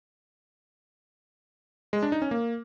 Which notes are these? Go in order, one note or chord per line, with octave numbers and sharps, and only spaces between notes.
G#3
D4
D#4
C#4
A#3